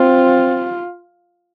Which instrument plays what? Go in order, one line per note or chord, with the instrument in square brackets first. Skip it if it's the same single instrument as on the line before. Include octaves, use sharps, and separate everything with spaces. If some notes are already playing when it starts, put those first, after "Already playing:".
Already playing: [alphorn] C4 [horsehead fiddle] F4